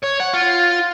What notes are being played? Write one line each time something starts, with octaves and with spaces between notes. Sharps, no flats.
C#5
F#5
F4